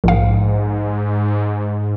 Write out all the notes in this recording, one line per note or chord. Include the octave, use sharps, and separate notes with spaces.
A#1 G#2 F5